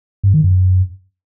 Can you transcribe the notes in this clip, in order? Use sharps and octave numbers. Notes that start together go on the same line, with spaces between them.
G2
D#3
F#2